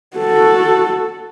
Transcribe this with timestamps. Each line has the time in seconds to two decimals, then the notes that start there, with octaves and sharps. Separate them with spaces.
0.17 F#4 A4